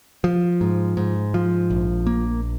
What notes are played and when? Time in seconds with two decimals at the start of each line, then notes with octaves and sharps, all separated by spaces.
0.24 F3
0.61 G#2
0.97 G#2
1.34 F3
1.70 A#1
2.07 A#3